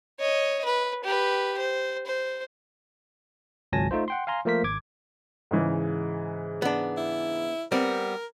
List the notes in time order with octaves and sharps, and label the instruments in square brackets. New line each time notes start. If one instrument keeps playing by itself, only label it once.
[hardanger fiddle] C#5 D#5
B4
G4 B4
C5
C5
[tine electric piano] G#1 C#2 F#3 G#5 A5 A#6
A3 D#4 F4 C5
F#5 G5 C6
F5 G#5 A#5 C6
F3 A3 A#3 A#4 C5 B6
G#1 D6 G#6
[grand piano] G#2 C#3 E3
[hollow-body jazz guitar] B3 D4
[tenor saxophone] E4
[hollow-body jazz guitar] G3 B3 C4 [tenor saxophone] A#4